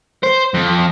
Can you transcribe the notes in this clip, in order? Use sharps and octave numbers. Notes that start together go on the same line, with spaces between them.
C5
F2